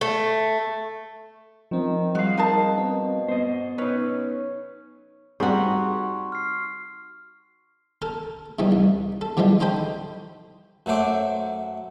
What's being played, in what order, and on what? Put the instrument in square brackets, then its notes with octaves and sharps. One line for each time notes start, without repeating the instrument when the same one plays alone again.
[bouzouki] A3
[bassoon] D#3 [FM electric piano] F3 C4
[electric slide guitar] G3 F5 [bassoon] G#3 [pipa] F#4
[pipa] D#4 A#4 A5
[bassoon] B2 [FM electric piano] C4
[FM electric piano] B3 [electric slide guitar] C5 D#5
[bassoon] C#4 [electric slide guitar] D#4 B4 [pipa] C#5
[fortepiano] G3 C4 G#4 [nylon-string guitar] D#4 F#4 [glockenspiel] C6 C#6
[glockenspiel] F6 C7
[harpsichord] A4 A#4
C3 E3 G3 D#4
C2
A4
C3 E3 F3 G3 G#3
D#4 A4 C5 G5 B5
F#2 F#3 A3 C5 D6